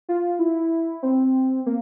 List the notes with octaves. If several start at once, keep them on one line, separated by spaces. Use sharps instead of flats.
F4
E4
C4
A#3